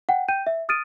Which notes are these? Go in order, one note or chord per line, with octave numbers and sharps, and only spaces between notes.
F#5 G5
G5 G6 D#7
E5
D#6 F6 A6 D7 D#7